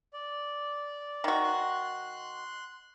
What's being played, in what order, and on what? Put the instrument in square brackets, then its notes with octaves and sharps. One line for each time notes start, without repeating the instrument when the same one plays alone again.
[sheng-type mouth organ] D5
[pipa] D#3 F#4
[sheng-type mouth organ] C6 F#6